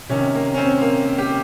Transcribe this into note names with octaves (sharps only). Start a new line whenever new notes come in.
C3 D#3 C#4
A#3
C#4
C4
A#3
G4